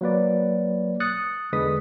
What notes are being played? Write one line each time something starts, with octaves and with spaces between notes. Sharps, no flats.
F#3 A#3 B4 D5
D#6 F#6 A6 C#7
E2 D3 G#3 B4 D#6 B6